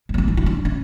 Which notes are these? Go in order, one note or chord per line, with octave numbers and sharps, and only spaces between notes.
G#3
A3
B3
D4
E4
D4
C#4